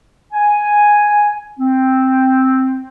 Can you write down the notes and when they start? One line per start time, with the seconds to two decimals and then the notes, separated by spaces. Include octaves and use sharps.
0.33 G#5
1.59 C4